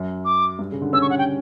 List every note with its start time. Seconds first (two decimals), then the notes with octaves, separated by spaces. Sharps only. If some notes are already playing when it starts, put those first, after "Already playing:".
Already playing: F#2
0.25 D6
0.59 G2
0.72 C#3
0.82 D3
0.93 C#4 E6
1.02 C#6
1.10 F#5
1.18 G5